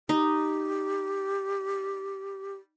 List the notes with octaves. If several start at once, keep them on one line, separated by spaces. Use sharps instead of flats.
D#4 G4